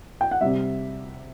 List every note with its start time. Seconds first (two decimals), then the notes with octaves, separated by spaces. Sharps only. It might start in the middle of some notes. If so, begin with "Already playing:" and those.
0.21 G5
0.31 F#5
0.41 C3 G3 E5